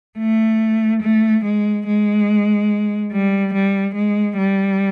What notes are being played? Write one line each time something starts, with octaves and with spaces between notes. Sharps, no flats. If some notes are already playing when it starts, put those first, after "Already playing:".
A3
A3
G#3
G#3
G3
G3
G#3
G3